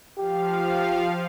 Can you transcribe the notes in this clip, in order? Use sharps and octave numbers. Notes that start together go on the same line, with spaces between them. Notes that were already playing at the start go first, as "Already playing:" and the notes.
F3 G4 F5